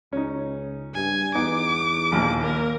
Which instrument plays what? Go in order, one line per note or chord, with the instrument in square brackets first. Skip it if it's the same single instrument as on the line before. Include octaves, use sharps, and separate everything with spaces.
[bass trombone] C#2 [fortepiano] C#4 D#4
[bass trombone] G2 [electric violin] G#5
[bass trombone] E2 [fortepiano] B3 D#4 [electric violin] D6
[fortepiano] A#1 D#2 A#2
[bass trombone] A#3 [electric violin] A#4